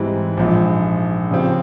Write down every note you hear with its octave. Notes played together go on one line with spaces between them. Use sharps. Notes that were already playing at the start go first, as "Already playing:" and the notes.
Already playing: G#2 E3 G3 C4 E4
A#1 G#2 F3
C#3 F3 C4 G4